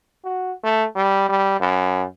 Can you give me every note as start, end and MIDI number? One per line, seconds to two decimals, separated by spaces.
0.25 0.52 66
0.64 0.85 57
0.95 1.29 55
1.29 1.57 55
1.60 2.05 42